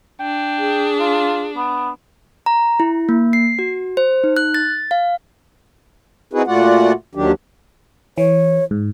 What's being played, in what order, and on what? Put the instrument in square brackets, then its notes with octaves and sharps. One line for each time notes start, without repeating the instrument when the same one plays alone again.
[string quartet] D4 [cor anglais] G5
[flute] G#4
[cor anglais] F4
B3
[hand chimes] A#5
E4
A#3
C7
F#4
C5
D#4
F#6
A6
F5
[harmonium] C4 D#4 E4 F#4 G#4 B4
A#2 A3 F4 F#4 D5 F#5
D#2 D#3 F#3 D4 G4
[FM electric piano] E3 [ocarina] C#5
[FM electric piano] G#2